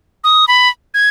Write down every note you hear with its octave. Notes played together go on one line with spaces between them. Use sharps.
D#6
B5
G#6